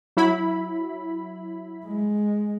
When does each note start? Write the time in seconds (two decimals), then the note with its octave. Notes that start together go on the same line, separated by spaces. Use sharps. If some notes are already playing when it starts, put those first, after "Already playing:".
0.17 F#3 E4 B5
1.86 G#3